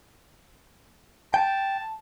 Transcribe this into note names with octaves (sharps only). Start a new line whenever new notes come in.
G5 A5